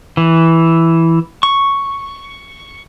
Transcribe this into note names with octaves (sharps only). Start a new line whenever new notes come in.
E3
C#6